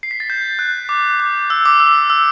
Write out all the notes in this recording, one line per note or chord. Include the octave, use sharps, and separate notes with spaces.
C7
B6
A6
G6
F#6
D6
D6
E6
D6
E6
E6